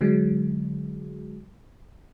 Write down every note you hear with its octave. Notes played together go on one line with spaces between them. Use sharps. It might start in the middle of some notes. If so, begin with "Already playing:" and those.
D3 F#3 G#3